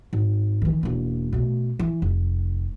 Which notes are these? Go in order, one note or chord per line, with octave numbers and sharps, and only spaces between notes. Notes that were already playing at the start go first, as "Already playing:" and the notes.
G#1
D#3 E3
E1 A#3
B2 A3
E3
F1